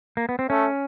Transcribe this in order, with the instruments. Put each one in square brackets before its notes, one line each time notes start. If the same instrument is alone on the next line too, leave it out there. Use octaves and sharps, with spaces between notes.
[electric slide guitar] A#3
B3
C4
[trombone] A3 [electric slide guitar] C#4